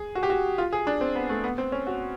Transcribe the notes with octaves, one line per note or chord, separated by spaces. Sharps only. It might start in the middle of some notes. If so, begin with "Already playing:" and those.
Already playing: G#4
F#4
G4
F#4
F4
G#4
D4
C4
B3
A3
B3
C4
C#4
F#4